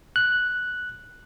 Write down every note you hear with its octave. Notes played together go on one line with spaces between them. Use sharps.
F#6